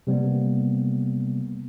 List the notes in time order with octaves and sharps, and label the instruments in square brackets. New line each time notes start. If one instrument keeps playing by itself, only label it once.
[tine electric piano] C3 G3 A#3 B3